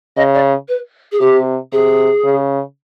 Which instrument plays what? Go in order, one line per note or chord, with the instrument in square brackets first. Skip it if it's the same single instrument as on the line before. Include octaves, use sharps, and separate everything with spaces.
[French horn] C#3 [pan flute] D#5
[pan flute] D5
B4
G#4
[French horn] C3 [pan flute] G4
[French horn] C3 [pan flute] G#4
[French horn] C#3